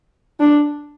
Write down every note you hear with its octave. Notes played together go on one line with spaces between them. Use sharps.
D4